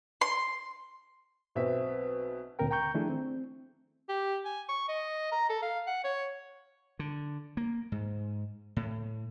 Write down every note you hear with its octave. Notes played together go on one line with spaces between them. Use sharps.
C6
B1 B2 C4 E5
D2 A#2 C4 A#4 G5
G5 A#5 C#6 G6
D#3 F3 A3 D4 E4 G#4
C4
G4
G#5
C#6
D#5
A#5
A4
F5
F#5
C#5
D3
A#3
G#2
A2